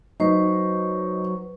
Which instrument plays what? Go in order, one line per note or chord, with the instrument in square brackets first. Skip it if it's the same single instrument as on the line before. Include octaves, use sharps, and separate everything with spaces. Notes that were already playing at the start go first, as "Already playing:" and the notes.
[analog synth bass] F#3 [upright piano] D#4 [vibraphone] B4 C5 C#6